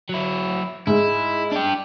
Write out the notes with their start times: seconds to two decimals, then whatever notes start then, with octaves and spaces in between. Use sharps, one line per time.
0.09 F#3 E4
0.87 G#2 G#3 E4
1.51 D4 G4